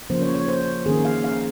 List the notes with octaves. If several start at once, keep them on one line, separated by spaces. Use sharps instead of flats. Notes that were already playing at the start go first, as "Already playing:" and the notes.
C#3 F3 A#3 C5
C#5
C#5
C5
D#3 A#3 C#4 G#4
F5
F5